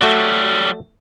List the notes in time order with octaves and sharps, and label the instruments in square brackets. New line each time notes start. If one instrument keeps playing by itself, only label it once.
[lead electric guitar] F#3 G3 [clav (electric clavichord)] A3 F#4 D5